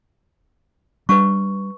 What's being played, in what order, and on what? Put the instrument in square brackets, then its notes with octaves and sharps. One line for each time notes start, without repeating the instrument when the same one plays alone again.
[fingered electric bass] G3 D4 [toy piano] B4 C#6